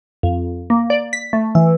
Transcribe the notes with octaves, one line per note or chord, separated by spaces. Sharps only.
F2
A#3
D5
B6
A3
E3